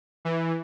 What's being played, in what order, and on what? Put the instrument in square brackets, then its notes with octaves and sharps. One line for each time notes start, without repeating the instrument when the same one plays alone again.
[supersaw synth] E3